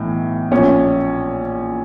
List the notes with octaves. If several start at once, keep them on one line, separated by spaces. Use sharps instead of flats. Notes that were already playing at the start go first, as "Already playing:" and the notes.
Already playing: B1 A2 E3
A#1 A#2 C#4